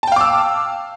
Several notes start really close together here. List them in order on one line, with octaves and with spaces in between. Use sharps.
A5 G5 F5 D6 E6